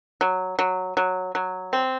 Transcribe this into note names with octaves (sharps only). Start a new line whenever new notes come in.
F#3
F#3
F#3
F#3
C4